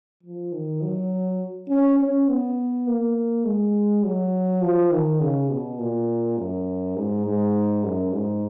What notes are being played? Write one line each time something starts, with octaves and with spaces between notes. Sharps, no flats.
F3
D#3
F#3
C#4
C#4
B3
A#3
G#3
F#3
F3
D#3
C#3
B2
A#2
F#2
G#2
G#2
F#2
G#2